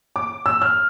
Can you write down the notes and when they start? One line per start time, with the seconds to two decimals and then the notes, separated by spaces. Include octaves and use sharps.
0.16 D6
0.46 E6
0.62 F6